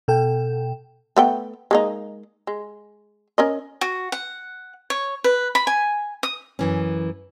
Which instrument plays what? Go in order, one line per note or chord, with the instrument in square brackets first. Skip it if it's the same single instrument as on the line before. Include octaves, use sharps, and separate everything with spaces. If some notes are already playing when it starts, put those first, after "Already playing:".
[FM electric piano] B2 A4 G5
[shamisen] A3 B3 G5
G#3 A#3 D#4
G#3
C#4 A#4 D#5
[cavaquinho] F#4
F#5
C#5
B4
B5
G#5
D#6
[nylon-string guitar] F#2 E3 C#4